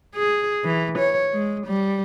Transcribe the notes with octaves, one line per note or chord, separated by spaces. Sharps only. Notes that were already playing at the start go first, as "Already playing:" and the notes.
G#4
E3
C#5
G#3
G3